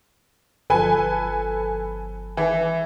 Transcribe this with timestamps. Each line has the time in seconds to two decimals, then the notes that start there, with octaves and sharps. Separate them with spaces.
0.70 G1 F3 A4 B4 G#5
2.37 E3 E5